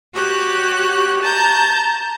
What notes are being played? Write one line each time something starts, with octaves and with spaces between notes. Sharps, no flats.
F#4 G4 C#5 F#6
A5 A#5 G6